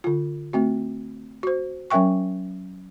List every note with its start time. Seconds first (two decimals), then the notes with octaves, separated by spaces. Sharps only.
0.04 D3 F4
0.53 A3 C4 F#4
1.43 F#4 C5
1.91 F#3 C#4 A#4 E5 G5 C#6